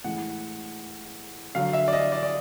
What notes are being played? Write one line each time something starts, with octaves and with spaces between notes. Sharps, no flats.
A2 E3 G#3 F#5
D3 F#3 F5
E5
D5
D#5
D5
D5